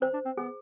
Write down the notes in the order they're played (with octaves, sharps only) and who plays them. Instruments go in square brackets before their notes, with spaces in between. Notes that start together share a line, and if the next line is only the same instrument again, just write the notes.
[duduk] C4 [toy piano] C5
[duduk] D4
C4
[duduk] B3 [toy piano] G#4